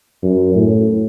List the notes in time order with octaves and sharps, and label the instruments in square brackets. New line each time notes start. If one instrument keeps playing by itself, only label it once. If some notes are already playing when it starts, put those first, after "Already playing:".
[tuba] F#2
A2